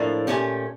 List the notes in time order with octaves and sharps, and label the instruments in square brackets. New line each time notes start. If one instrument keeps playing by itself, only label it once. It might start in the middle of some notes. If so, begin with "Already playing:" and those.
Already playing: [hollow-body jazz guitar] A2 F3 A#3 D4
A#2 A3 C#4 G4